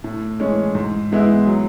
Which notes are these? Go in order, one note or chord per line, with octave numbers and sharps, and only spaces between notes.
A2
E3 G#3 C#4
G#2
E3 G#3 B3 E4
F#3